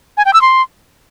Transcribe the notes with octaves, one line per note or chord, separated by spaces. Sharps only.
G#5
G5
E6
C6